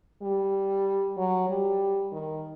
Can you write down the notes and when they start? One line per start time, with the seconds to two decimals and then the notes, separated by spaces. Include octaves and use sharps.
0.22 G3
1.17 F#3
1.49 G3
2.12 D#3